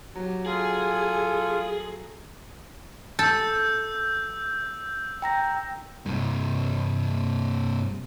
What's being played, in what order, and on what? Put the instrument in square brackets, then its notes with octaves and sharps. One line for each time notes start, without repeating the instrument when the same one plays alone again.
[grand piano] F#3 [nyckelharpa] G4
[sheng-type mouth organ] F4 [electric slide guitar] G#4 [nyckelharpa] A4 G#5
[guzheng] A4 [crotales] E6 G6
[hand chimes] G5 A#5 A#6
[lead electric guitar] G2 C3